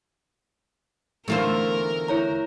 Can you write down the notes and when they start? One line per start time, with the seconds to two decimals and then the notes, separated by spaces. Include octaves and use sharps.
1.28 E2 D3 E3 A3 F4 A#4 C5
2.08 E4 C#5 A#5